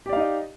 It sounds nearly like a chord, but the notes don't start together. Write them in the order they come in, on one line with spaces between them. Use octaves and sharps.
G4 D5 F5 D#4 D#5